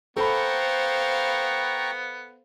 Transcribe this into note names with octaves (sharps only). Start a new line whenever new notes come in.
B3 A4 C5 F5 G5 A#5 B5 C#6